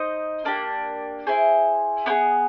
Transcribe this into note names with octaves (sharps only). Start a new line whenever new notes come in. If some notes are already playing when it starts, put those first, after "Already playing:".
Already playing: D#4 C5 D#5
A#3 D4 G4
E4 G#4 C5
B3 E4 G#4